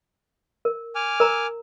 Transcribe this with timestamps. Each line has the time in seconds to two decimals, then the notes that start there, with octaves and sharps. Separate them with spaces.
0.65 A#4
0.95 G#5 D6 F6
1.20 A#4 A#5